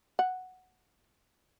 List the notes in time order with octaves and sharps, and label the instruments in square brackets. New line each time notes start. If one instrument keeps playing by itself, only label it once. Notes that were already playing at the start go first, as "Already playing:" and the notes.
[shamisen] F#5